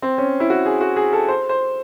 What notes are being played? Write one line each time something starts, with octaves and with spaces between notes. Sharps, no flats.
C4
C#4
E4
F#4
G#4
F#4
G#4
A4
C5
C5